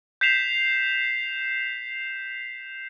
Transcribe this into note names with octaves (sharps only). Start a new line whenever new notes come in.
G6 B6 C7 E7 F7